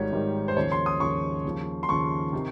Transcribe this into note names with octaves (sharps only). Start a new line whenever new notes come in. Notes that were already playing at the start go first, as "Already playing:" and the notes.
Already playing: G#1 G#2 D#3 G3 C#5
G#1 G#2 D#3 G3
C5
D#2 C#3 F3 C#5
C6
D#6
D#2 C#3 F3 C#6
D#2 C#3 F3
C6
D#2 C#3 F3 C#6
C3 D#3